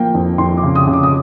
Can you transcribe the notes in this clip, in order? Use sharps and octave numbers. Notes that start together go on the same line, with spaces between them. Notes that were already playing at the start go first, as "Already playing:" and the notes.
Already playing: F3 A#3 G5
F2
F2 C6
D6
C#3
D#6
C#3
D6
D#6